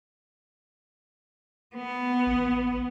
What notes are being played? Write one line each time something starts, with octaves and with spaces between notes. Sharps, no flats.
B3
A1